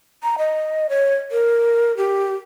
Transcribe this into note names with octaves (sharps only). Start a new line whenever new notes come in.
A#5
D#5
C#5
A#4
G4